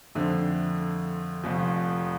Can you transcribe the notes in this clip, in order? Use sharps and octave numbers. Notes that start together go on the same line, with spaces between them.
F2 D3 A3 C4
F1 F2 F3